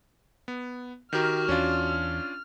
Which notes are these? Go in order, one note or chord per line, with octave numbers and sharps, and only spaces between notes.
B3
D#3 F#4 G4 A#4 F6
E2 C#4 D4 F4